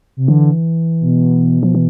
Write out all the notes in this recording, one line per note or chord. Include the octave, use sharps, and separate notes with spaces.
C3
D3 E3
B2
F3
E3